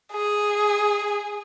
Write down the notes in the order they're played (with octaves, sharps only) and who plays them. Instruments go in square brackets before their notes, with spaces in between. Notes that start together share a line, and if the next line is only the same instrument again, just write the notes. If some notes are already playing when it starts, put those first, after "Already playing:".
[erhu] G#4